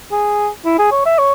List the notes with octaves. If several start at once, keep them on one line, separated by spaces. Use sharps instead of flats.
G#4
E4
G#4
C#5
E5
C#5